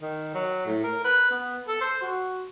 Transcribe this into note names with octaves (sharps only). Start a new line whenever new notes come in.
D#3
F#3
A2
A#4
B4
B3
A4
C5
F#4